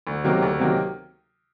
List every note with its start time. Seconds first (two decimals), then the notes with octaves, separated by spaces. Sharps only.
0.07 D2
0.24 C3 D#3 F#3 A#3
0.42 D2
0.59 C3 D#3 F#3 A#3